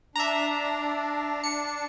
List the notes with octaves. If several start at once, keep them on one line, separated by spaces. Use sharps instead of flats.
D4 E5 A#5
C#7